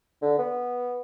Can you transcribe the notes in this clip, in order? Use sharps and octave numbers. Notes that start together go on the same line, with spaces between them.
D3
B3